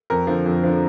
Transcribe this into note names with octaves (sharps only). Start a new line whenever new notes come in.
F2 A#4
D3 F3
F2
D3 F3